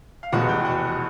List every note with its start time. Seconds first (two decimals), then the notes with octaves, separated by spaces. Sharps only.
0.23 F5
0.32 F1 E2 B2 G#3 F#4 F#5
0.48 G4 G5
0.64 F#4 F#5